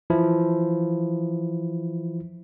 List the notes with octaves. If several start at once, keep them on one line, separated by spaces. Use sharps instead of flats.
E3 F3 E4